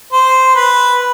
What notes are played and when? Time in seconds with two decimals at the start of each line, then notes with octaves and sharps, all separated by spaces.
0.13 C5
0.55 B4